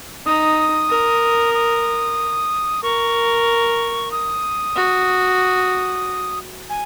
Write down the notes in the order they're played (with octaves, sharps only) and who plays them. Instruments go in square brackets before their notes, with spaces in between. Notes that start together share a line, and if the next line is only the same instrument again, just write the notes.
[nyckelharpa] D#4 [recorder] D#6
[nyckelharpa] A#4
[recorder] D#6
[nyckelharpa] A#4 [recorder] C#6
[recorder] D#6
[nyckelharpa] F#4
[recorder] G#5